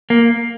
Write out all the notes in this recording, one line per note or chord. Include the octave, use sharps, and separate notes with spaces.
A#3